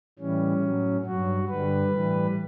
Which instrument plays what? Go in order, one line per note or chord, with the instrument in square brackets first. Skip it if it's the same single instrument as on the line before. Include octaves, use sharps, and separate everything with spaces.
[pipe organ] A2 E3 G3 C#4
A2 F#3
G2 F#3 F#4
G2 D3 G3 B4
A2 E3 G3